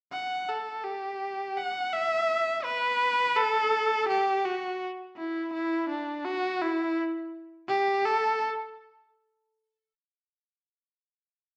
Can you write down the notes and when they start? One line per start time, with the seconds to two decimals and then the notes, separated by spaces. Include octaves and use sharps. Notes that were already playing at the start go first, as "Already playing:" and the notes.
0.13 F#5
0.49 A4
0.84 G4
1.58 F#5
1.93 E5
2.65 B4
3.37 A4
4.09 G4
4.45 F#4
5.17 E4
5.53 E4
5.89 D4
6.25 F#4
6.62 E4
7.69 G4
8.06 A4